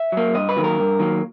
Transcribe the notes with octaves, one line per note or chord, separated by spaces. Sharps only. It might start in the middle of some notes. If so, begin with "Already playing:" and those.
Already playing: E5
F#3 A#3
G2 D#5
B4
D#3 F#3 A#3
A#4
G2
D#3 F#3 A#3